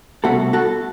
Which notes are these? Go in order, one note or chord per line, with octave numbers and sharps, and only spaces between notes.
C2 B2 A3 F#4 A4
F#4 A4